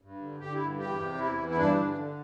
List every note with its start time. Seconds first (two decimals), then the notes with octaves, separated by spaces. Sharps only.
0.02 G2
0.21 D3
0.40 D3 G4
0.54 E4
0.59 G2
0.79 E2 G4
0.98 C3
1.18 E2 E4
1.37 E3
1.49 E4
1.56 G2 D4
1.76 D3
1.95 D3